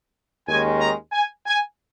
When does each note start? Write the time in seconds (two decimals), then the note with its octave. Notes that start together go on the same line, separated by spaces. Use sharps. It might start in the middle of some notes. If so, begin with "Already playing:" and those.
0.47 D#2 D#3 G#3 C#4 G#5
0.80 A#5
1.12 G#5
1.46 G#5